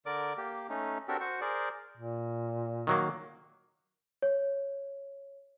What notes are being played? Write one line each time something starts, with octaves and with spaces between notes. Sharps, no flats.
D3 A#4 D5 D6
A#3 G4
A3 C#4 D#4
C4 D4 F#4 G4 A4 A#4
F#4 C5 C#6
G#4 A#4 C5 D5
A#2
D#3 F#3 A#3
C#5